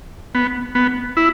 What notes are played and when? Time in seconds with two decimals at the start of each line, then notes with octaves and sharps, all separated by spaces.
0.35 B3
0.75 B3
1.17 E4